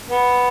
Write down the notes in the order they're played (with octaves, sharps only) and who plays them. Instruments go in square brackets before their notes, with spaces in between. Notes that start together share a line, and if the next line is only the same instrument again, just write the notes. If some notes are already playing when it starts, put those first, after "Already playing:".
[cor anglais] B3